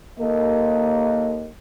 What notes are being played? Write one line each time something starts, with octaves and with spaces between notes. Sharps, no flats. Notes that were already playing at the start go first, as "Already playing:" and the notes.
D#2 A#3 A4 D#5